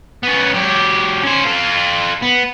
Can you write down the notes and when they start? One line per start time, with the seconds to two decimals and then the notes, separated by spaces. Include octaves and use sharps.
0.23 B3 C#4
0.54 F#3 G4
1.23 C#4 C5
1.45 F4 A4
2.22 B3